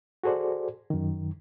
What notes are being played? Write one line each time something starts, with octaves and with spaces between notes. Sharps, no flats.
F#4 G#4 A4 C5 D5
F#2 D#3